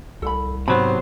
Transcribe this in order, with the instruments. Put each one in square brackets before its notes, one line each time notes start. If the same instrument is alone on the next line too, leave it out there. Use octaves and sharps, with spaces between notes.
[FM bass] C2 [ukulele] A4 B5
[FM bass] G#2 [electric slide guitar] C3 F#3 B3 [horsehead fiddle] C5 [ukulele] B5